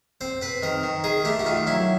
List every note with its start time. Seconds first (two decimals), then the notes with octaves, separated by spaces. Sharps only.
0.21 C4 C5
0.41 C4 B4
0.63 D#3 A#4
0.83 D#3
1.04 D#3 G#4
1.25 A3 G4
1.39 F#4
1.46 D#3 F4
1.67 F#3 E4